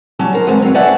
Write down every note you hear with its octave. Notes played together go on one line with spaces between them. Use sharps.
F#3 G3 C#4 D4 A5
A#4 C5
E2 D3 G#3 C4 G4 C5
G2 F#3 C4
C#4 B4 D5 E5 F#5 A5